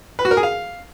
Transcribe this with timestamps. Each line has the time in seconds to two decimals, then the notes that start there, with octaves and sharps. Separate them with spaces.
0.19 B4
0.25 F#4
0.31 A#4
0.37 G#4
0.43 F5